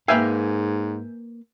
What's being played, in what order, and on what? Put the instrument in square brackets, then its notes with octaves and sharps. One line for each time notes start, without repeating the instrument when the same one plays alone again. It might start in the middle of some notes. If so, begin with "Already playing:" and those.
[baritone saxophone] G#2 [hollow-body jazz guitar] A#3 B4 F5 [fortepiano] E5 G5 G#5